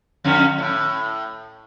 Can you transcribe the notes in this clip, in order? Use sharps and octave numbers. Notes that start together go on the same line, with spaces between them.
F2 D3 C#4
A2